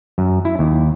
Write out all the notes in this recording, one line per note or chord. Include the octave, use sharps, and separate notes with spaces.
F#2
E4
D#2